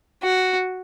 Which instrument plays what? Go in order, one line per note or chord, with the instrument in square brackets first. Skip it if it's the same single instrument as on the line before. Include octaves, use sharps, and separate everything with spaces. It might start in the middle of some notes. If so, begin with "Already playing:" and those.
[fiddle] F#4